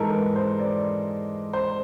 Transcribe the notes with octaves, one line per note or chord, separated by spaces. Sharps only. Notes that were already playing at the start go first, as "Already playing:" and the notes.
Already playing: G#2 E3 G#3 A4 A#4
B4
C5
D5
C5